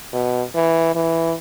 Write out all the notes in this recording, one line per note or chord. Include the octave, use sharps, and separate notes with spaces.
B2
E3
E3